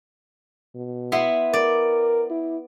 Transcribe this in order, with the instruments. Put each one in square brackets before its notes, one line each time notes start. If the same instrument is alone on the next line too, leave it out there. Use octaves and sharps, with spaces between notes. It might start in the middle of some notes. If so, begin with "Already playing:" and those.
[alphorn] B2
[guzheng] B3 E4 C6
[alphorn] A#4 [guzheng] D5
[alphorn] E4